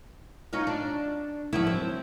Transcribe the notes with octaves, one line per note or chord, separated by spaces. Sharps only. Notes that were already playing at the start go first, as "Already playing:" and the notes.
C#4 D#4 F4
D4
F3 F#3 E4
C4